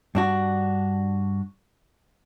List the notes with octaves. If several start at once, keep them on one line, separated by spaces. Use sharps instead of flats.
G2 D4 F#4